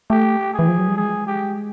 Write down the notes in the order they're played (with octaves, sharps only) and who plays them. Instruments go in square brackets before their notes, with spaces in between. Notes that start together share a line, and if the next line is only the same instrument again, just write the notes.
[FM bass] A3 [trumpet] G4
[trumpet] G#4
[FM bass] E3
F3
F#3
G3
[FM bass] G#3 [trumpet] G#4
[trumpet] G4